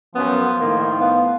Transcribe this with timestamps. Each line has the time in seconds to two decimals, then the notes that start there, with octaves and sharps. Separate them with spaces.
0.15 F#2 F3 B3
0.61 A2 D#3 A#3
1.00 B3 F5